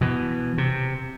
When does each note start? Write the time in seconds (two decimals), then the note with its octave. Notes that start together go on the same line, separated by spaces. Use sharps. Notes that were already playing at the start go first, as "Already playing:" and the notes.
0.01 B2 E3
0.58 C3